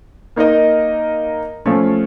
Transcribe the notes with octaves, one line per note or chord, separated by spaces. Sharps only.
A#3 D#4 A#4 D#5
F3 A3 C#4